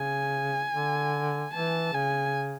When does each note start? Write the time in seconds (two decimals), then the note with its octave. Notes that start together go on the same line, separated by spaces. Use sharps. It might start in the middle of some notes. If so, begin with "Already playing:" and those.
Already playing: C#3 G#5
0.73 D3
1.53 E3 A5
1.93 C#3 G#5